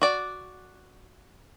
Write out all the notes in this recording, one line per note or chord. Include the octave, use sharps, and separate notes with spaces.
F#4 D5